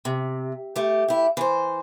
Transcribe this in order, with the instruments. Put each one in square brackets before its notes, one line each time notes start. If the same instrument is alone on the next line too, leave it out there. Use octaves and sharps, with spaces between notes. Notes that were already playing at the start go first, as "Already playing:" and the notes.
[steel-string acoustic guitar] C3
A3 G4
E4 G4
E3 C5